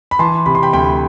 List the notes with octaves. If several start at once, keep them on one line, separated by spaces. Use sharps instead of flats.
B5
E3 A5 C6
C3 B5
C6
G5 B5
D2 G5 B5